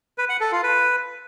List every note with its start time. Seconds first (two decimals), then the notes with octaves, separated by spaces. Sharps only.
0.18 B4
0.29 F#5
0.41 A4
0.52 F4
0.63 B4